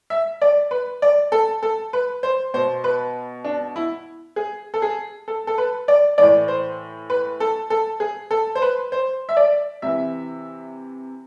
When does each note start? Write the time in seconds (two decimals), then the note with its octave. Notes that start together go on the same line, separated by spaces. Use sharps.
0.10 E5
0.42 D5
0.71 B4
1.02 D5
1.32 A4
1.63 A4
1.93 B4
2.23 C5
2.54 B2 C5
2.84 B4
3.44 D4
3.76 E4
4.36 G#4
4.74 A4
4.82 G#4
5.28 A4
5.47 A4
5.58 B4
5.88 D5
6.18 A2 E3 D5
6.48 C5
7.10 B4
7.40 A4
7.70 A4
8.00 G#4
8.31 A4
8.55 C5
8.62 B4
8.92 C5
9.29 E5
9.37 D5
9.82 C3 E3 E5